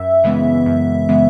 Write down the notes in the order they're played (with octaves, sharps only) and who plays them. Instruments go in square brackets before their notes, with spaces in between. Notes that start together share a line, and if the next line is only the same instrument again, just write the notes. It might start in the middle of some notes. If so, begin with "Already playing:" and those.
Already playing: [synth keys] F#2 [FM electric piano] E5
[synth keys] C#3 E3 G#3 B3
F#2
C#3 E3 G#3 B3